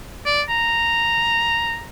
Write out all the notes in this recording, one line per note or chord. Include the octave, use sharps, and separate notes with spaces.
D5
A#5